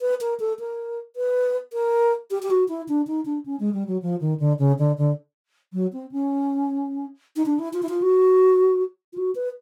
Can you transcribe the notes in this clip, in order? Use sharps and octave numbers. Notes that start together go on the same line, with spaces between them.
B4
A#4
A4
A#4
B4
A#4
G4
G4
F#4
E4
D4
D#4
D4
C#4
G#3
G3
F#3
F3
D#3
D3
C#3
D3
D3
F#3
C4
C#4
D#4
D4
E4
F4
E4
F4
F#4
F4
F#4
B4